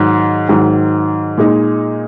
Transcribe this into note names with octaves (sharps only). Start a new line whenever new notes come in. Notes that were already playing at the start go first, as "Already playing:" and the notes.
Already playing: G#2 D#3 F#3
G#2 D#3 F#3
A#2 G#3 D#4